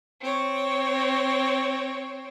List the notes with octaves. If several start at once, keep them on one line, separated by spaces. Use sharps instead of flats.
C4 C#5